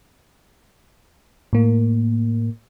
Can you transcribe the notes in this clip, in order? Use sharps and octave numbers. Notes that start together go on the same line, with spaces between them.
A2 A#3